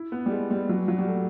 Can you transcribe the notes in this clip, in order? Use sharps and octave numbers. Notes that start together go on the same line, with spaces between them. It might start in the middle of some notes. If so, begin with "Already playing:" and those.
Already playing: E4
B3
G3
G#3
G3
F#3
F#3
G3
A3